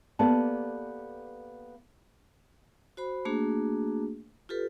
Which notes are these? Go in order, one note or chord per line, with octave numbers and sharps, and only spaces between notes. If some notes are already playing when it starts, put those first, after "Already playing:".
A#3 B3 G4 A4 D5 A5
F#4 C5 B5
A3 A#3 D4 F#4 G#4
F4 G4 A4 B4